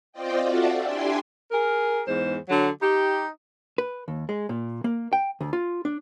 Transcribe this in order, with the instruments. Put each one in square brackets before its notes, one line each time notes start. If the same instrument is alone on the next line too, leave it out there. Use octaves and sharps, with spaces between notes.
[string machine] C4 F4 C5 D5 D#5 G5
F4 F#4 A4 D5 E5 F#5
D4 E4 G4 G5 G#5 C6
[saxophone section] G#4 A#4
E2 G#2 C5
D3 F#3
D#4 G4
[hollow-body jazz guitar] B4
D#2
G#3
A#2
A#3
G5
D2
F4
D4